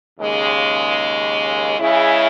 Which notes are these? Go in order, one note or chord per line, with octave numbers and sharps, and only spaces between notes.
D#2 C#3 G#3
C#3 G#3 C#4 E4